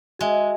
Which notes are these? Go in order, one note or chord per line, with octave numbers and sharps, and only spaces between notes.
G#3 F#4 E5 G#5